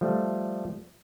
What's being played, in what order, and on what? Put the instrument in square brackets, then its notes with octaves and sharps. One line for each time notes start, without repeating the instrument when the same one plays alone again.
[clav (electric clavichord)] F3 G3 A3